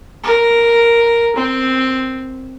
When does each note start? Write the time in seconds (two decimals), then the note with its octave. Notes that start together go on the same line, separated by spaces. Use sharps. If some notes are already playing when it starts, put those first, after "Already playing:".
0.23 A#4
1.36 C4